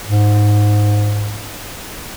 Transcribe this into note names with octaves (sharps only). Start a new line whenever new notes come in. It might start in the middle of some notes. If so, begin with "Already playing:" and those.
G#2